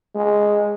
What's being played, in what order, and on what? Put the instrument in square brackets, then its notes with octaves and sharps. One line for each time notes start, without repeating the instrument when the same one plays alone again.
[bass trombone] G#3